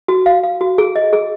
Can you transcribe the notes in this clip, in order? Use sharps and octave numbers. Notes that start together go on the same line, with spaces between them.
F#4
F5
F5
F#4
G#4
D#5
G#4